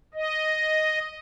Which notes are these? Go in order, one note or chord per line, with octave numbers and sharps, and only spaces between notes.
D#5